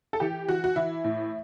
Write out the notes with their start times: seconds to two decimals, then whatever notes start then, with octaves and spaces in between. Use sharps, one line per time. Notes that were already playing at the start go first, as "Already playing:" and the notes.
0.13 A4
0.20 E3 G4
0.48 E3 F#4
0.64 F#4
0.76 E3 E4
1.04 A2